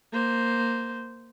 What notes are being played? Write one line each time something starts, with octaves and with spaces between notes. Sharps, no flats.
A#3 C5